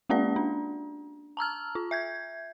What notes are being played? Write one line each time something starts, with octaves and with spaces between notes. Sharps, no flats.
G#3 A#3 C#4 G4 D5
D4
A5 A#5 E6 F6
F4
E5 G6 G#6